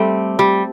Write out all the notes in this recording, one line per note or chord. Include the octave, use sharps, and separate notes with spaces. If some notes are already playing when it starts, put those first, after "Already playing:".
Already playing: G3 A3 C4
G3